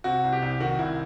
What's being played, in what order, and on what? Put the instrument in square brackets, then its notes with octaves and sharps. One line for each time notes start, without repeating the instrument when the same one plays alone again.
[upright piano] C3 [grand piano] F#4
[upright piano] C2
[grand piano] G4
[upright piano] C2
[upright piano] D#3 [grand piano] F#4
[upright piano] C2 [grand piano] E4